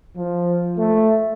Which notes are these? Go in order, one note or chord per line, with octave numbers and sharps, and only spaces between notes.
F3
A3